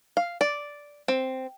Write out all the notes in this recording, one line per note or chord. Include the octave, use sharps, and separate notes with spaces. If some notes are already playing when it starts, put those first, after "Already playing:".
F5
D5
C4